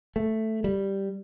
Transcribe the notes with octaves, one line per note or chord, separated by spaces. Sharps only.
A3
G3